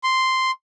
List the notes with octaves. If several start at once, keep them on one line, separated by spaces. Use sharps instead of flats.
C6